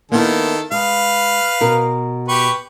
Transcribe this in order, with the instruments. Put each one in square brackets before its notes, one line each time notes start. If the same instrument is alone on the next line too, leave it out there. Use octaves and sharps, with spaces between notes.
[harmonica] D#3 A4 [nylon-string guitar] A#3 B3 E4
[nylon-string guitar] G#3 [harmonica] B4 F5
[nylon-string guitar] B2 A#4
[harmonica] G4 B4 C#6